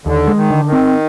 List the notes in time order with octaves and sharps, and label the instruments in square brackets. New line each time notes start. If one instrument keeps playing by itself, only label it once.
[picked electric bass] D#2 [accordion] D3
[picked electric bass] G#3
[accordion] D#3
[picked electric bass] D3
[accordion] D#3
[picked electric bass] C4